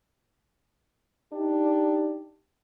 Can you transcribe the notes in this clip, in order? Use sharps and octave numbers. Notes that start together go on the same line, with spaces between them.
D4 D#4 G4